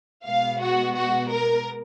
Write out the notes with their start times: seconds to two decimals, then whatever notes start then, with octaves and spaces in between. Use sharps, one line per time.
0.25 B2 G#3 B3 F5
0.60 F#4
0.95 F#4
1.31 A#4